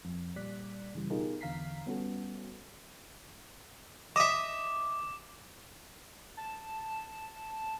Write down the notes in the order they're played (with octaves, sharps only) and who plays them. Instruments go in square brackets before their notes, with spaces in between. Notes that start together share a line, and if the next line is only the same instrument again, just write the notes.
[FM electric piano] F2
A#2 G3 D5 F#6 B6
G2 C#3 E3 G3
B2 D#4 F4 G4 G#4 A#4
E2 D3 F5 A#5 B6 C7
G3 B3 C#4 F#4 A4
[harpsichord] D#5 E5 [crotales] D6
[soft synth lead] A5